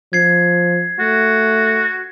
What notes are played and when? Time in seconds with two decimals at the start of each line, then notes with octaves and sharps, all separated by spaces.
0.13 F3 G#6 C7
0.99 A3 F#4